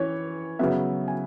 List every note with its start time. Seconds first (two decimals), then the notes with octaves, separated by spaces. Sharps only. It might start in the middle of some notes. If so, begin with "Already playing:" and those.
Already playing: E3 C#4 C#5
0.59 C#3 F#3 B3 E5
1.08 G#5